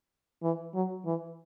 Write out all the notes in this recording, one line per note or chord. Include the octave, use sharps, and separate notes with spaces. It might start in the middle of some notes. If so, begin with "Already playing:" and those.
E3
F#3
E3